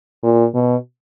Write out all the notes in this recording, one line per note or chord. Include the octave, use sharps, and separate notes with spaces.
A#2
B2